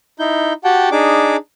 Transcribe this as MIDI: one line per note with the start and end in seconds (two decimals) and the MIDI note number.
0.19 0.53 63
0.19 0.53 64
0.19 0.53 91
0.64 0.89 66
0.64 0.89 67
0.64 0.89 78
0.64 0.89 79
0.64 0.89 81
0.91 1.36 62
0.91 1.36 63
0.91 1.36 68
0.91 1.36 86